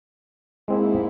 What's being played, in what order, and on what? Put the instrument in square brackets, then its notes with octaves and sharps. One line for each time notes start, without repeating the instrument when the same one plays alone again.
[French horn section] G#2 A#3 E4 [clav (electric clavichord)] G#3 C4 G#4